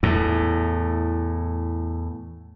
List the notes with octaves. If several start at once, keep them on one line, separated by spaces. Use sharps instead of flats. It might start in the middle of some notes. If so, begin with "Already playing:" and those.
E2 A2